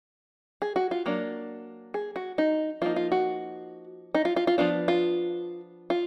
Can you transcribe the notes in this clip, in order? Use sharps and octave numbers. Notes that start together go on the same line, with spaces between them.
G#4
F#4
F4
F#3 A#3 D4
G#4
F#4
D#4
F3 A#3 D#4 F4
F4
F#4
D#4
F4
F4
F4
F3 B3 D4 F4
F4
F4